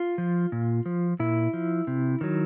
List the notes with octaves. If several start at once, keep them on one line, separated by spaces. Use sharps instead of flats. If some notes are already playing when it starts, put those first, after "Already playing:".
Already playing: F4
F3
A#2
F3
A#2 E4
F3
C3
D#3 F#3